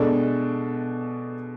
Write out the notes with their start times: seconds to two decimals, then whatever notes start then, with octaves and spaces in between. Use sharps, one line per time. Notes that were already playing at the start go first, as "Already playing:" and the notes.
Already playing: B2 G#3 D4 A4